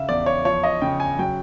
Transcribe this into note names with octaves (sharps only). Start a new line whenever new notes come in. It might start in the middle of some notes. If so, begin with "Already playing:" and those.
Already playing: C#3 E5 F5
E2 D5
C#5
F3 C#5
D#5
C#3 G5
G#5
F#3 G5